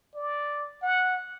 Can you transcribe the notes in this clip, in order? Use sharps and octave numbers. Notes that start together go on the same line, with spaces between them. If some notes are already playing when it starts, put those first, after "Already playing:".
D5
F#5